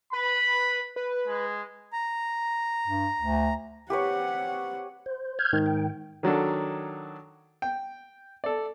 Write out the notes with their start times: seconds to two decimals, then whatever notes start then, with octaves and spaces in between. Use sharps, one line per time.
0.13 B4 B5
0.96 B4
1.28 G#3
1.93 A#5
2.87 G2
3.21 D2
3.90 C4 G4 B4 C#5 F#5
5.06 C5
5.39 F6 G6 G#6
5.53 G#2 D#3
5.66 G5
6.23 D#3 F#3 D4 A4
7.62 G5
8.44 A4 D5